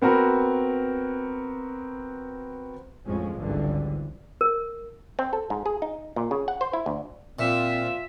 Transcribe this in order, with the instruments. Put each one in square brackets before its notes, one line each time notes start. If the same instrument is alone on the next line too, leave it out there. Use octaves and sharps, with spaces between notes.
[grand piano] B3 C4 F#4 A#4 B4
[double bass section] A1 F2 F3 G#3 C#4
G#1 C#2 G2 D3 E3
[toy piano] A#4
[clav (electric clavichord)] C4
A4
G#2
G#4
D#4
A#2
C#3
F#5
C5
E4
D2
[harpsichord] A#2 [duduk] C4 [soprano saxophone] F4 [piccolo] E5